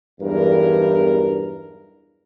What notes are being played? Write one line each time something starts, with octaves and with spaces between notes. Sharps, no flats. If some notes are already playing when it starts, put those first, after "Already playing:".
B1 E2 G2 A#4